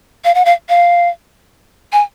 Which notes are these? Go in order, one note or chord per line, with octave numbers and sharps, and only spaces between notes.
F5
F#5
F5
F5
G#5